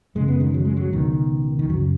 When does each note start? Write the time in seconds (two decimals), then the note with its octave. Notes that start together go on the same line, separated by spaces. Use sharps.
0.15 F#2 C#3 G#3
0.28 B3
0.40 D#3 G#3
0.54 F#3
0.65 G#3
0.77 F#3
0.92 C#2 B2 D#3
1.59 D#3
1.70 F#2 C#3 F#3